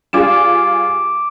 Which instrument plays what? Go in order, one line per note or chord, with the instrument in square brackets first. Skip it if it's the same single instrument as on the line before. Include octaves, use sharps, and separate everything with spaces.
[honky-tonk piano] G3 F4 G#4 [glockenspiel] D6 D7 E7